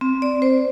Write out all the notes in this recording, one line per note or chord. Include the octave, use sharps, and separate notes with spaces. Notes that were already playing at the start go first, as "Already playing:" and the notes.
C4
D5
C5